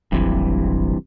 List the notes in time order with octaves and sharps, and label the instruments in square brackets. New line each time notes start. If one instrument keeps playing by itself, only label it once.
[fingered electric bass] D#1 G#1 F#3 [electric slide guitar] G2 C3 E3